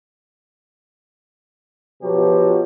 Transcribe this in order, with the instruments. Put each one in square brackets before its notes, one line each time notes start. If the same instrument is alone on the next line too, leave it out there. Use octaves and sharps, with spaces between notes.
[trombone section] B2 F3 F#3 G4